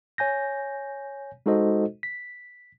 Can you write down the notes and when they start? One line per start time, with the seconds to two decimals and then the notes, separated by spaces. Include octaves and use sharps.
0.18 C#5 G#5 G6 A#6
1.46 G#3 D#4 F#4 A4 C5 D#5
2.03 B6